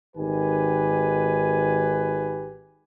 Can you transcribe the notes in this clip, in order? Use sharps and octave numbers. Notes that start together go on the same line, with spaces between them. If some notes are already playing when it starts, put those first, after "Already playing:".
G#1 D#3 G4 B4 G#5